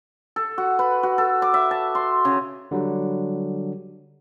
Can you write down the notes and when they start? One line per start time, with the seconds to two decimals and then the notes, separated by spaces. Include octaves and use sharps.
0.36 A4
0.58 F#4
0.79 B4
1.03 F#4
1.18 A4
1.42 D6
1.54 E5
1.71 A5
1.95 C6
2.25 C#3
2.71 D3 F#3 G3